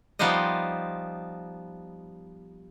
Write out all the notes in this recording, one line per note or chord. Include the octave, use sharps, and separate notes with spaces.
F3 G3 B3 D#4 C5 D#5